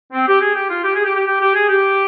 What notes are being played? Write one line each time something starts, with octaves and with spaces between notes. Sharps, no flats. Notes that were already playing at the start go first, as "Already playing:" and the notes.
C4
G4
G#4
G4
F4
G4
G#4
G4
G4
G4
G4
G#4
G4